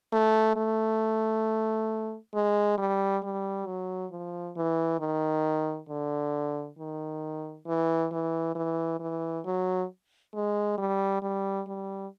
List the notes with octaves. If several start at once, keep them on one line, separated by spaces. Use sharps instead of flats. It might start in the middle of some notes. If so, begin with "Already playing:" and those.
A3
A3
G#3
G3
G3
F#3
F3
E3
D#3
D3
D#3
E3
E3
E3
E3
F#3
G#3
G3
G3
G3